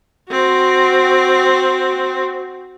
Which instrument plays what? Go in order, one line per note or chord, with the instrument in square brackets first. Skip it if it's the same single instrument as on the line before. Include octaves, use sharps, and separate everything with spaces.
[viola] C4 F#4